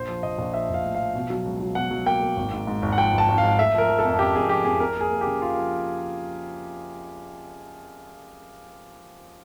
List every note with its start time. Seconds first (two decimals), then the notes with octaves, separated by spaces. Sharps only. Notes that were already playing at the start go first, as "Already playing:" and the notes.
Already playing: A#1 C5
0.09 F3
0.23 A#1 D#5
0.39 A#1
0.54 F3 E5
0.70 A#1 F5
0.85 A2
0.95 F3 F5
1.15 B2
1.30 F#3
1.46 C#2
1.60 F#3
1.75 B2 F#5
1.91 F#3
2.06 A#3 G5
2.21 A#3
2.37 G#1
2.52 G#2
2.67 G#2
2.82 G#1
2.92 F#5
2.98 F3 G5
3.13 G#1 A5
3.28 G#1
3.38 F5
3.43 G#2
3.58 A3 E5
3.74 F3 A#4
3.90 F3
3.99 A4
4.05 F2
4.19 C#3 G4
4.35 F2 G#4
4.49 F3 G4
4.65 F2 G#4
4.80 F2 A#4
4.96 A#3 G#4
5.11 A#3
5.21 G4
5.26 C#3
5.41 F3 F4
5.57 F3